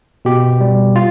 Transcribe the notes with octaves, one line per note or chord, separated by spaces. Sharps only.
B2 G4
G3
F4